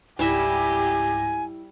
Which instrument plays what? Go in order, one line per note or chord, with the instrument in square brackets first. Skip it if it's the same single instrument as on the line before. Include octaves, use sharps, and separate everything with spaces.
[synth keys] C#2 G#2 A#6 [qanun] G3 E4 E5 [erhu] G4 [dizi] G#5